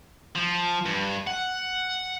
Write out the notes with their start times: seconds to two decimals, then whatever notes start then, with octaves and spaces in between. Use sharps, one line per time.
0.36 F3
0.86 G2
1.27 F#5